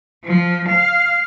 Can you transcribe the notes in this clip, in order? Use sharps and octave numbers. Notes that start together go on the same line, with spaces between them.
F3
F5